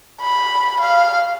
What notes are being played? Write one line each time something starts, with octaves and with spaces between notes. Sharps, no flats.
B5
F5